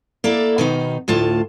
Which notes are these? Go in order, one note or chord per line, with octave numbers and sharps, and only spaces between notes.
A#3 E4 A4 D5
B2 D#3 D#4
D2 A2 F4 A5